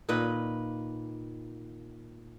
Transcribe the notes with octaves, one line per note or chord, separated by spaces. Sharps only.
A#2 D#3 B4 D#5